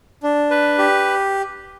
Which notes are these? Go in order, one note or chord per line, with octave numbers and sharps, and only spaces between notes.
D4
B4
G4